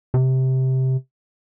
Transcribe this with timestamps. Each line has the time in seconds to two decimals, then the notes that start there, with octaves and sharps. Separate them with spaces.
0.14 C3